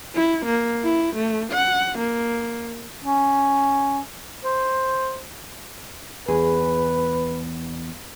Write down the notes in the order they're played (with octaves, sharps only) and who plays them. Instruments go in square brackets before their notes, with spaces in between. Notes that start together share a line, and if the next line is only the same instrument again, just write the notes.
[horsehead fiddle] E4
A#3
E4
A3
F#5
A#3
[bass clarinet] C#4
C5
[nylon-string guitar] E2 G#4 [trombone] B4